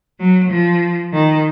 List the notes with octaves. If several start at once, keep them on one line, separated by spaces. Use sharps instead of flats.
F#3
F3
D#3